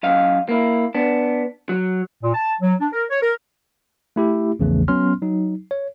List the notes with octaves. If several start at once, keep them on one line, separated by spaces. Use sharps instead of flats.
F#2 D#5 F5
A#3 E4
B3 D4
F#3
A#2
A5
F#3
D4
A#4
C#5
A#4
A3 E4 G4
A#1 E2 C#3 E3 A3
F#3 B3 C#4 C6 F6
F#3 D#4
C#5